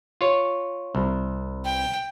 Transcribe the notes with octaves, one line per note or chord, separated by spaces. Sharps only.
F4 C#5
C2
G5